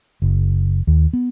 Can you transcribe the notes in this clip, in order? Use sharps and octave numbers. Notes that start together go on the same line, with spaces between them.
F#1
D#2
B3